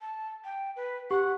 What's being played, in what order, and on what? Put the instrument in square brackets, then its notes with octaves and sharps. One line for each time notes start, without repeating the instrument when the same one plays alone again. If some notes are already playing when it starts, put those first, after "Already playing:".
[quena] A5
G5
B4
[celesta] G4 C#6 [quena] F#5